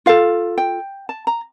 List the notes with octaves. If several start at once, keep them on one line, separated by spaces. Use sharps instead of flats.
F4 A4 F5
G5
A5
A#5